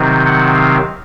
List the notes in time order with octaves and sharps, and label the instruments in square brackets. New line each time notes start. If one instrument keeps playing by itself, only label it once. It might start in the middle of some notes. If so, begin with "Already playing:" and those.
Already playing: [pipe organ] C3 D#3 F#3 C4 D#4
F#5
F5